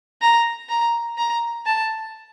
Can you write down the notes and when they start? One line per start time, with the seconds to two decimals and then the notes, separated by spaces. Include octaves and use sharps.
0.21 A#5
0.69 A#5
1.17 A#5
1.66 A5